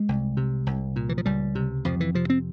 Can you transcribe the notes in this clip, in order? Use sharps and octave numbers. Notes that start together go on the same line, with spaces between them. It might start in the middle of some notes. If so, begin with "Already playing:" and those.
Already playing: G#3
C2
C3
C2
A#2
E3
F3
C#2 G3
C3
F2 F3
E3
C3 F3
C4